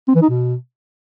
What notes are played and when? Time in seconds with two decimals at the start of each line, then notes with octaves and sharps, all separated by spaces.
0.08 C4
0.15 E3
0.22 D#4
0.29 B2